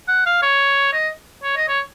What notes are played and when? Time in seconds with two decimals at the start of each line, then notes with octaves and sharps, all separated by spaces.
0.08 F#5
0.26 F5
0.42 C#5
0.93 D#5
1.43 C#5
1.57 D#5
1.69 C#5